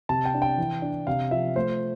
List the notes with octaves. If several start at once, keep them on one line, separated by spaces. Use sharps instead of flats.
C3 A5
G5
D4
G5
E3
D4
C3 F5
F3 E5
A3 C5